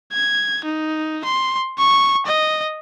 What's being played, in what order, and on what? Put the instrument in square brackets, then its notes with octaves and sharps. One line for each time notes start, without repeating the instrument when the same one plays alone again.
[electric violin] G#6
D#4
C6
C#6
D#5